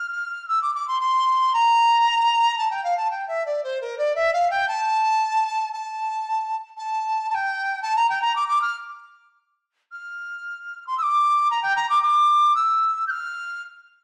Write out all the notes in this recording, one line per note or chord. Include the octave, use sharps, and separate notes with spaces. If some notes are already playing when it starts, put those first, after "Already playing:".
Already playing: F6
E6
D6
D6
C6
C6
A#5
A5
G5
F5
A5
G5
E5
D5
C5
A#4
D5
E5
F5
G5
A5
A5
A5
A5
G5
A5
A#5
G5
A#5
D6
D6
F6
F6
C6
E6
D6
A#5
G5
A#5
D6
D6
E6
G6
F6